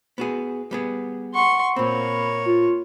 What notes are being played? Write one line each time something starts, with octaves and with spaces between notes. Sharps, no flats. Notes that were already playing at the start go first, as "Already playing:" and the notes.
B3 F#4 G#4
G3 B3 G#4
F#5 C6 C#6
A#2 A#3 C4 C#5 B5
F4